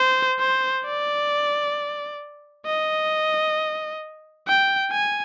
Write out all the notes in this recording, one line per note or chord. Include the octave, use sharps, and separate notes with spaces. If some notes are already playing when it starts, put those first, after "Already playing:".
Already playing: C5
C5
D5
D#5
G5
G#5